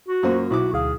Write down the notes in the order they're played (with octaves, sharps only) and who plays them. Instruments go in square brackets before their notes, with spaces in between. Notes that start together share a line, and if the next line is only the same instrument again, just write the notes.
[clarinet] F#4
[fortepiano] F#2 F#3 A#3 [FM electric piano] F4 C5
[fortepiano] B1 E4 D6 [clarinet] F#4
[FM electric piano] D2 F5 [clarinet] G#4